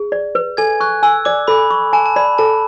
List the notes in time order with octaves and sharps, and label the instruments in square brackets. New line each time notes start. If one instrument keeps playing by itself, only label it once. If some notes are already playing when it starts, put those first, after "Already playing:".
Already playing: [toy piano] G#4
D5
B4
[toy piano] A4 [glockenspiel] G#5 G#6
[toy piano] C#6 [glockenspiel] F#6
[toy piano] G#5 [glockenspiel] E6
[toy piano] D5 [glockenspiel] D6
[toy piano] A4 [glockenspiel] B5
[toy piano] C#6
[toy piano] G#5 [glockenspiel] A5
[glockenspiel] A5
[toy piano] D5 [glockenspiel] B5
[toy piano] A4 [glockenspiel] A5